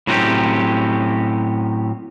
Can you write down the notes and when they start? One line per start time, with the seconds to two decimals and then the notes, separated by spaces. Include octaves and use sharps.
0.07 A2 F#3 C4 C#4 F#4 G4